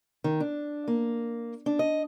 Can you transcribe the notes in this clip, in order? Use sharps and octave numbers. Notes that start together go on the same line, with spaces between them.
D#3
D4
A#3
D4
D#5